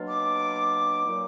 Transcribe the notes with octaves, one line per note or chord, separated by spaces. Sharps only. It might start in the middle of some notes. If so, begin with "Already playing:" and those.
Already playing: B2 F#3 A#3 D4 F4
D6
A#2 F#3 A#3 D#4